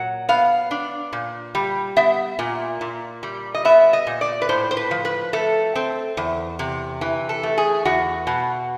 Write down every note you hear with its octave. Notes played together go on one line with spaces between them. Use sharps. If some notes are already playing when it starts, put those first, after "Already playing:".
Already playing: A#2 F#3 F#5
B3 F5
D4
A#2
G3
B3 E5
A#2
A#2
G3
D#5
B3 E5
D#5
A#2
D5
B4
A2 C5
C5
B4
F3
B4
A3 A4
C4
E2
C3
E3
A4
A3
G#4
E2 F#4
B2